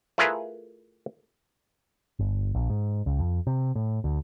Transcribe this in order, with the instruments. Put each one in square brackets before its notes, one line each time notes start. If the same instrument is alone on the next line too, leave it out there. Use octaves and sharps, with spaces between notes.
[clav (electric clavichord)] A3 E4 F4 G#4 A#4 B4
[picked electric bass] G1
A#1
G#2
C#2
F2
C3
A2
D2